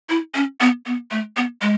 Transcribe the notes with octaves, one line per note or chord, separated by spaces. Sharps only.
E4
C#4
B3
B3
A3
B3
G#3